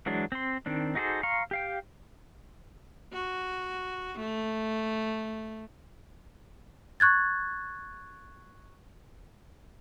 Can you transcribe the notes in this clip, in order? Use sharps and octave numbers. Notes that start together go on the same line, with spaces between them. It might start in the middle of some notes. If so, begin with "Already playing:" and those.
E3 F#3 G#3 D4
C4 C6
D#3 C4 D4
D#4 F#4 G#4 A4 C5
F5 A#5 C6 C#6
G4 F5 G5
F#4
A3
C#6 F#6 G#6 A6